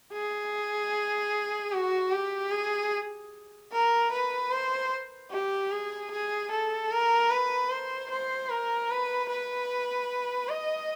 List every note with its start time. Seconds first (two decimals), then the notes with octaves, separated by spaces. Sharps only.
0.13 G#4
1.72 F#4
2.12 G4
2.52 G#4
3.72 A#4
4.12 B4
4.51 C5
5.30 G4
5.71 G#4
6.11 G#4
6.51 A4
6.91 A#4
7.31 B4
7.70 C5
8.10 C5
8.50 A#4
8.90 B4
9.29 B4
10.49 D#5